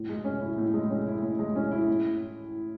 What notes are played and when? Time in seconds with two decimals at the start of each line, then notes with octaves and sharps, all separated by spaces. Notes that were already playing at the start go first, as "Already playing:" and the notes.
Already playing: A2
0.09 G#3
0.25 C#4
0.41 E4
0.58 A2
0.74 G#3
0.90 C#4
1.07 E4
1.22 A2
1.39 G#3
1.56 C#4
1.72 E4
1.88 A2